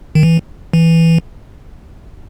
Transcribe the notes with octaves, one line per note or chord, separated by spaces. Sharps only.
D#3
E3
E3